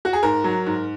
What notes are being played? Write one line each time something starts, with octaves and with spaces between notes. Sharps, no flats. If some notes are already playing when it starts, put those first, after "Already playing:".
F#4
G#4
G#2 A#4
F#3
G#2